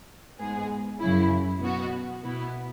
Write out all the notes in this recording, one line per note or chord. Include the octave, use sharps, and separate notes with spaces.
G#2 G#3 B3 G#4
F#2 C#3 F#3 E4
B2 B3 F#4
B2 B3 E4